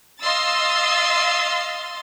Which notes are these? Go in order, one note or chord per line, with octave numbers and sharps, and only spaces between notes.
D#5 F5 C6 E6 A6